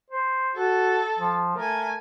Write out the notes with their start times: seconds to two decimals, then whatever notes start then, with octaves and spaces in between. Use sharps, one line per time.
0.10 C5
0.56 F#4 A4
1.19 F3
1.56 A3 A#4 G#5